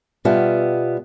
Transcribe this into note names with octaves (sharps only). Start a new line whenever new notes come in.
B2 G3 B3 F4 E5